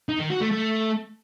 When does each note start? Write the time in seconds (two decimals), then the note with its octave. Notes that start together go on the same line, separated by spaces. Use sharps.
0.09 D#4
0.20 D#3
0.30 F#4
0.41 A3
0.52 A3